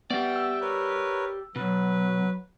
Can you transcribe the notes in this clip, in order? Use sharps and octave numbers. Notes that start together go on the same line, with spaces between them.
B3 G4 D5 E5 G5
E6
A#4 B4 C#5
B2 F#3 B4